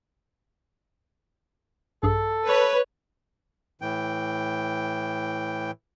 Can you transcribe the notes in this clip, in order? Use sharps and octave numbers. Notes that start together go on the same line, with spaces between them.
A#1 G2 G#4 A4
B4 C#5
A2 E3 G5